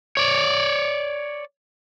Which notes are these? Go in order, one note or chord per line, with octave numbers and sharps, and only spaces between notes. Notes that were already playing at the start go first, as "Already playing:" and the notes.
C#5 D5